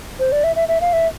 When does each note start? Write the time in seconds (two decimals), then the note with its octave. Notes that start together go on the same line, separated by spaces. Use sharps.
0.20 C5
0.32 D5
0.44 E5
0.56 E5
0.68 E5
0.81 F5
0.93 E5